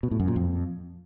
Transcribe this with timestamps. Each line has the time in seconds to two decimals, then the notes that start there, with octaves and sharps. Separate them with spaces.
0.03 B2
0.11 A2
0.20 F#2
0.28 A#2
0.36 F2